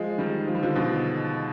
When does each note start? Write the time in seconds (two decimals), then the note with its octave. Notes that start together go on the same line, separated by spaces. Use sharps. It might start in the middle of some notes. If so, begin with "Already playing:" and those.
Already playing: F3 G#3
0.18 D#3 G3
0.47 F3
0.55 G3
0.63 D3 F3
0.75 B2 D3